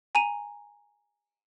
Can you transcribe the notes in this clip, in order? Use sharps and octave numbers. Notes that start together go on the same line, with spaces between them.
G#5 A#5 D#7